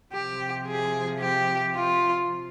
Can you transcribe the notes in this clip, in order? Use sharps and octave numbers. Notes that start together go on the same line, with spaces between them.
C3 F3 G4
G#4
G4
F4